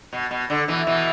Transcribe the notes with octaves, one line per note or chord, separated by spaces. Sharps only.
B2
B2
D3
B2 E3
B2 E3